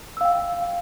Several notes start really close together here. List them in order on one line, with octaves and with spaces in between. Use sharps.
E6 F5 G5